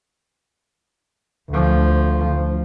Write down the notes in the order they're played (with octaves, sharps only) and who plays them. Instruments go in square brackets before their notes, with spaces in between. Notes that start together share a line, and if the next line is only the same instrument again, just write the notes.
[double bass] D2 F3